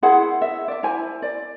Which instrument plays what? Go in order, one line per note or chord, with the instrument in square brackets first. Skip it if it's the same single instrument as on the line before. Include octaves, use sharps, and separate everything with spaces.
[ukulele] E4 G#4 C5 F#5
E5
D5 E5
E4 C5 G#5
D5